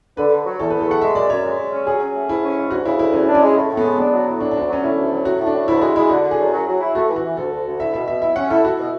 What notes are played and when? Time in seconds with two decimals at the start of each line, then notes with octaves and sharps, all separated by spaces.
0.17 D3 B4
0.31 D3
0.46 F#3
0.59 E2 A4
0.70 E2 B4
0.81 A4
0.87 A3 F#5
1.01 G#3 E5
1.15 F#2 D5
1.30 F#2 C#5
1.44 G#3
1.58 G#3
1.73 C#4
1.87 F#3 G#4
2.01 C#4
2.15 A3
2.29 G#2 E4
2.43 C#4
2.57 G#2
2.71 D2 F#4
2.85 C#3 E4
2.99 D2 E4
3.13 E2 C#4
3.27 D4
3.35 C#4
3.42 G#3
3.56 A2
3.70 A2
3.77 B3
3.84 G#3
3.98 B3 D4
4.13 F#3
4.27 A2
4.40 F#3 D4
4.51 D4
4.55 D2
4.62 D4
4.68 F#3 C#4
4.83 A3 E4
4.97 D2
5.11 F#3
5.25 A2 F#4
5.39 A2
5.47 D4
5.54 A2
5.68 D2 E4
5.81 G#3 F#4
5.96 G#3 E4
6.10 D3 F#4
6.25 D3
6.31 G#4
6.39 F#2
6.53 F#3
6.67 F#3
6.80 E4
6.95 A3 F#4
7.09 E3
7.16 F#4
7.23 E3
7.37 D2 A4
7.52 D2
7.66 D2
7.80 E4 E5
7.94 B2 E5
8.08 B2 E5
8.22 E4 E5
8.36 C#4 F#5
8.50 E4 A4
8.64 E4 F#4
8.79 B2